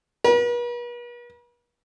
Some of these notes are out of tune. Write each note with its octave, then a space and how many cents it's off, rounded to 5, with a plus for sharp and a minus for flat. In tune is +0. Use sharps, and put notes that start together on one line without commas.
B4 -45